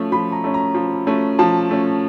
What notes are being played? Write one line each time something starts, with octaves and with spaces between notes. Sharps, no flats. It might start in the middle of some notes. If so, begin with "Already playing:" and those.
Already playing: F3 A3 C#4
F3 B5
A#5
A3 C#4
A#5
F3
A3 C#4
F3 A5
A3 C#4